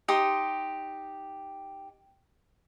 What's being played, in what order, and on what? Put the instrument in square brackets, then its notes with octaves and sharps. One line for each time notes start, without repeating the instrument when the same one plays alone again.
[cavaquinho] D#4 G4 C6 D#6